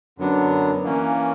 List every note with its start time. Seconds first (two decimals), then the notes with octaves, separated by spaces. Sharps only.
0.18 F#2 D3 F#3 B3 D4
0.84 E3 A#3 C#4